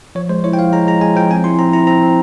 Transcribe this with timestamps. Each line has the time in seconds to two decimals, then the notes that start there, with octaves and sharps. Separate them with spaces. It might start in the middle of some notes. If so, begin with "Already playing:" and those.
0.15 F3 C#5
0.29 G#3 C5
0.44 E4 C#5
0.53 G5
0.59 F3 F5
0.72 G#3 A#5
0.87 G#3 A#5
1.01 G#3 G#5
1.16 F3 G5
1.30 C4 G#5
1.44 E4 C6
1.59 C4 A#5
1.73 E4 A#5
1.87 C4 A#5
2.03 C4